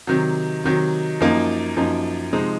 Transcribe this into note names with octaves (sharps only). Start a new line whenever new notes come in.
C3 D#3 F#3
C3 D#3 F#3
F#2 F3 A#3 D#4
F#2 F3 A#3 D#4
C3 F3 G#3 C4 D#4